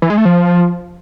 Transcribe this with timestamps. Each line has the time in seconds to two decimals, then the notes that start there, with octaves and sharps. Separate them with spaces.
0.02 E3
0.10 G#3
0.18 A3
0.25 F3